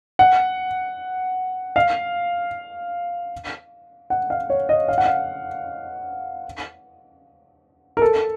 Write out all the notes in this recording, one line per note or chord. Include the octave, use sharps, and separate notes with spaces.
F#5
F5
F#5
F5
C#5
D#5
F5
F#5
F5
A#4
A4